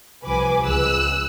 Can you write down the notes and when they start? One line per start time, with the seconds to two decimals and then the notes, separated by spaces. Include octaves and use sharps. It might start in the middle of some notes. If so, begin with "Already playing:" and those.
0.23 C2 F3 B4 G#5 D6
0.64 C#2 E6 F#6